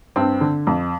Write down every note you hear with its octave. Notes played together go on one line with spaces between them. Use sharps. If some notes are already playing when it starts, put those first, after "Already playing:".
G2 C4
D3
F2